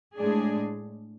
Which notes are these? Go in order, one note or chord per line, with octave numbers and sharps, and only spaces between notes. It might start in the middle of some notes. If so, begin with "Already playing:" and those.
A2 G#3 D4 G#4